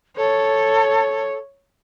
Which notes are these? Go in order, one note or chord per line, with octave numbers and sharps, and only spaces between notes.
A4 C#5